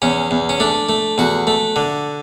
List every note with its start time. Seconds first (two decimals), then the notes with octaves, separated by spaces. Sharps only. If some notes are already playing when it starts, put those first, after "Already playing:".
0.02 E2 C#4
0.31 E2
0.49 C#4
0.60 A3 D4
0.89 A3
1.18 E2 F#4
1.47 A3
1.76 D3